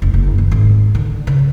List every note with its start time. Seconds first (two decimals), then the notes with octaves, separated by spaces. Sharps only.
0.02 F1
0.14 F#1
0.38 D#2
0.51 G#1
0.95 D3
1.27 C#3